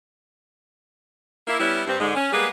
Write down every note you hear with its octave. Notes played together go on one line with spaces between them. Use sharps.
A#3 E4
G3 B3 C#4 E4
G2 C4
G#2 D3 G#3
C#4
G3 G#3 A#3 B3 G#4 B4